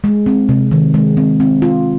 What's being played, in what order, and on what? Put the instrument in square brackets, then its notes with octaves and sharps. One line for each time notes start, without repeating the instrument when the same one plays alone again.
[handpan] G#3
C4
C3
D#3
G#3
C4
C4
F4